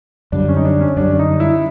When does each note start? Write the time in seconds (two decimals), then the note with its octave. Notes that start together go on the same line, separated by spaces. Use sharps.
0.32 F#2 D3 G3 D4
0.48 C#4
0.57 D#4
0.65 D4
0.81 C#4
0.96 F#2 D3 G3 D4
1.14 D4
1.19 D#4
1.40 E4